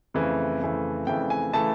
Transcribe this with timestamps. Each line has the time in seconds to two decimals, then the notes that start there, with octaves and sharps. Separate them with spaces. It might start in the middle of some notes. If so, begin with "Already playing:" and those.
0.14 F2 C#3 E3 A3
0.60 F2 C#3 E3 A3
1.07 F2 C#3 E3 A3 G5
1.30 G#5
1.53 C#3 E3 A3 A5